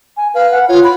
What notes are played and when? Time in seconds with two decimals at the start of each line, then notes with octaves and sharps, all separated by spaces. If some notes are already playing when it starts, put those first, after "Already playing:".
0.17 G#5
0.35 B4 F5
0.51 F#5
0.69 F4 C#5
0.84 B5